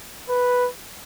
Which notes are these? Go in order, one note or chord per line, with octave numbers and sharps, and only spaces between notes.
B4